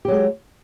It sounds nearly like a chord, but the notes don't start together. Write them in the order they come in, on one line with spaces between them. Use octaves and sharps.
G4 F#3 G#3